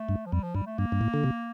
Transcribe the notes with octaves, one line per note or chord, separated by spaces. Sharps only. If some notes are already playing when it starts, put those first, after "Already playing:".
Already playing: A3
G2
F3
F2 G3
F3
G2 G3
A3
G2 A#3
G2
A2
D3
C3